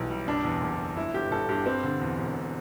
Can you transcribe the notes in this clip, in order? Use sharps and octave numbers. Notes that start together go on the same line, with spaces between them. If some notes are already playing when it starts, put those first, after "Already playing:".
Already playing: B1 E3 F#3 G3
G3
F#1 D4
E2
F#1
F#1
G1 E4
G1 G4
G1 A4
G2 G4
G3 C4
D3
E2
E1